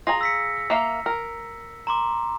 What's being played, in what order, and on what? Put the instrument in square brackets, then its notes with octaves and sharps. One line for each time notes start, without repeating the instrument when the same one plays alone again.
[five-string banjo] F4 G#4 A#5 [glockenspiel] A#6
[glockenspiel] E6 B6 C#7
[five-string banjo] A#3 E5 F5
A#4
[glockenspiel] A#5 C6 D6